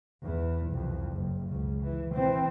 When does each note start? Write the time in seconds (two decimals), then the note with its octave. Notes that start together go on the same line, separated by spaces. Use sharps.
0.23 E2 E3
0.71 C2 F2
1.13 F#1
1.48 C#2 C#3
1.83 E3
2.14 E3 C4